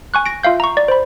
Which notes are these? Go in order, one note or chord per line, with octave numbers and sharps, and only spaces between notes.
G#5 C#6 F#6
A#6 D7
F4 E5 F5 G6
A#5 C#6
D5
C5 B5